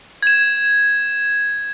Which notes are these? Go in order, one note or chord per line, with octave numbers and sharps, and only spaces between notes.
G#6 E7